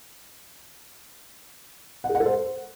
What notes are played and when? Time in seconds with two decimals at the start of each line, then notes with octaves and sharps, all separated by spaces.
2.04 F#5
2.09 G#4
2.15 F#5
2.20 A4
2.25 C5